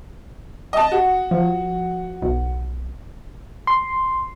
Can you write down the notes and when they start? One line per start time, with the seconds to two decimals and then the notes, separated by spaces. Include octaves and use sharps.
0.73 D#5 A5
0.92 F#4
1.31 F3
2.22 B1
3.67 C6